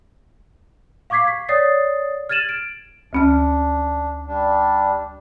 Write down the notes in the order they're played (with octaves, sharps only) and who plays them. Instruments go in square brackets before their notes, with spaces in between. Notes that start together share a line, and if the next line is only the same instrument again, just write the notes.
[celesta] F5 C#6 D6 G#6 B6 C7
B6
C#5 D5 D#6 A6 C7
F6 G#6 A6 D#7 E7 F#7
D7
[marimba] D2 C#4 F6 [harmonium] D4
[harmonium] G3 D4